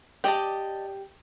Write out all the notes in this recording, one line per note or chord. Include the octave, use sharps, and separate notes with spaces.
G4 D5 D#5 A5